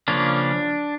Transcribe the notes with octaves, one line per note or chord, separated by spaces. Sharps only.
C#3 F3 A#3 C#4 D4